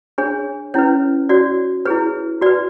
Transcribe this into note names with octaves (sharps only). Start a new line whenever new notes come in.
D4 G#4 C#5
C#4 E4 B4 C#5
F#4 C#5 D5
E4 G#4 B4 C#5
F#4 B4 D5